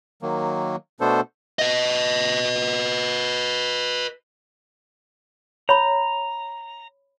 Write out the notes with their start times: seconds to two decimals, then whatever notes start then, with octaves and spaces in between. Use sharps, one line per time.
0.22 D#3 F#3 A#3
1.00 B2 A3 B3 D4 A4 C5
1.59 B4 D#5
5.69 C#5 A#5 B5